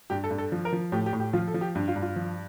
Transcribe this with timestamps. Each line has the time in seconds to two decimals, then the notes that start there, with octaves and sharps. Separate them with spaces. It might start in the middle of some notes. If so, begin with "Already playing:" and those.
0.10 G2 G4
0.24 A4
0.31 G2
0.38 A4
0.52 F3
0.65 A#4
0.72 F3
0.92 A2 G4
1.06 G4
1.13 A2
1.20 G4
1.33 F3 F4
1.47 A4
1.54 F3
1.61 G4
1.75 G2
1.88 F4
1.96 G2
2.02 F4
2.16 F3